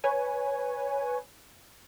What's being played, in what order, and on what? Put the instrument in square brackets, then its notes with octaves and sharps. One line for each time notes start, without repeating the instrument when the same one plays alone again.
[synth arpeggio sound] B4 C#5 G#5